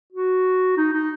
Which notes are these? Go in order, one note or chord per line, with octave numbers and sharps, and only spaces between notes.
F#4
D#4
D#4